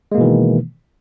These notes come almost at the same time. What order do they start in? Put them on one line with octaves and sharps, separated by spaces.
G#3 A#3 B2 E3 D#3